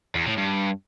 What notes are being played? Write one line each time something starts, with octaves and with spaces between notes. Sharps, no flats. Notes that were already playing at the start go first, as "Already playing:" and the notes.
E2
A2
G2